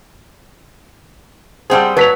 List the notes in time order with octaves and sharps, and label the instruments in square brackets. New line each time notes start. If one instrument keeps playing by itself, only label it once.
[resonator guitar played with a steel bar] G3 C4 G#4 [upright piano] C5 F#5 A5
[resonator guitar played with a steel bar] F#3 [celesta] B4 [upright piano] A5 B6 F7